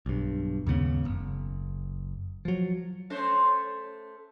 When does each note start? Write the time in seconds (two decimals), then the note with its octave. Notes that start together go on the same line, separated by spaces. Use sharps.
0.06 B1 G2
0.66 D#2 G#2 C#3 B3
1.05 F#1
2.45 F3 F#3
3.10 A3 C#4 C5